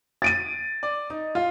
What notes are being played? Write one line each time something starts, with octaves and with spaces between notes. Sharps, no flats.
A6 D7 D#7
D5
D#4
F4 F5